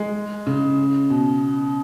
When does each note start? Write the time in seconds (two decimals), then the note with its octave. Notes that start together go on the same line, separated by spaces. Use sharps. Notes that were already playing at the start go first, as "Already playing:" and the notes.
Already playing: G#3
0.47 C#3
1.10 B2